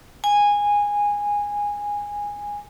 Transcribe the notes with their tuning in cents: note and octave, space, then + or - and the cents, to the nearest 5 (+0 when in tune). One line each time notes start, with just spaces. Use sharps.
G#5 -15